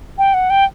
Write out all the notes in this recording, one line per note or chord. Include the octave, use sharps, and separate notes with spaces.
G5
F#5
G5